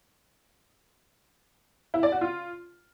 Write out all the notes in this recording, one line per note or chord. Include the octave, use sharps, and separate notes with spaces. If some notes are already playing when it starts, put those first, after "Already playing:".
E4
D5
F#4
F4